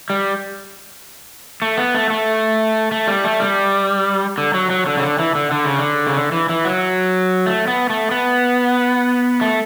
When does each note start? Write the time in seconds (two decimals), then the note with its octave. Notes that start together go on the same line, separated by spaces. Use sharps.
0.10 G3
1.62 A3
1.77 B3
1.95 A3
2.10 A3
2.92 A3
3.08 G3
3.24 A3
3.40 G3
4.38 D3
4.54 F#3
4.70 F#3
4.86 D3
4.97 C#3
5.02 D3
5.19 E3
5.35 D3
5.52 D3
5.65 C#3
5.79 D3
6.07 C#3
6.16 D3
6.32 E3
6.49 E3
6.65 F#3
7.46 A3
7.67 B3
7.90 A3
8.11 B3
9.41 A3